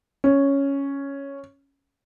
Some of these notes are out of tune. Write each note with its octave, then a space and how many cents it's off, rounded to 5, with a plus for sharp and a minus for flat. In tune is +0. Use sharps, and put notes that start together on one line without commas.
C#4 +0